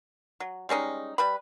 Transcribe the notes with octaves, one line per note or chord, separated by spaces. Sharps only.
F#3
G3 G#3 C#4 D#4
G3 B4 B5